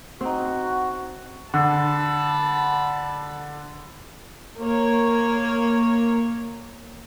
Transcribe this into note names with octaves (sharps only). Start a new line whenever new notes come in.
C4 D#4 F#4
D3 A5 B5
A#3 C#5